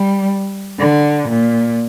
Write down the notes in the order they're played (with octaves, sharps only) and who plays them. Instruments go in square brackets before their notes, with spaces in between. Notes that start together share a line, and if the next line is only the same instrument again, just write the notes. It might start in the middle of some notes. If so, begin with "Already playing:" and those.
Already playing: [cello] G3
D3
A#2